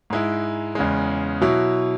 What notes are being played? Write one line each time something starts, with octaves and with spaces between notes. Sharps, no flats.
G#2 G#3 E4
E2 C#3 G#3
B2 F#3 E4